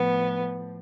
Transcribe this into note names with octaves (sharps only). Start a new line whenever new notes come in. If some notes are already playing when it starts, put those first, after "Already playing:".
Already playing: A2 F3 B3